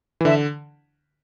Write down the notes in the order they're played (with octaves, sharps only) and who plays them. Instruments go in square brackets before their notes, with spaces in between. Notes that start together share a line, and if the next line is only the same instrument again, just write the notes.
[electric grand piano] E3
[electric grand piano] D3 [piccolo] E5